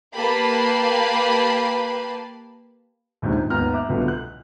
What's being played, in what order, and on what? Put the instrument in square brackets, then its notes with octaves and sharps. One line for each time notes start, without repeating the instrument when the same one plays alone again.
[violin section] A#3 G4 B4 A5 B5 C7
[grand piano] A#1 D#2 G#2 C3 D#3
G#2
G#1 D#2 B3 A#5 F6
E5 D6 F#6
D1 C2 B2 D3 F4 B4
F#6